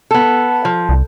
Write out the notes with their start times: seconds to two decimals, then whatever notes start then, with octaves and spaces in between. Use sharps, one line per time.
0.11 B3 A4
0.65 F3
0.89 C2